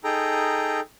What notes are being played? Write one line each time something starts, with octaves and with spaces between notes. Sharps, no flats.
D#4 G#4 A4 G5 A#5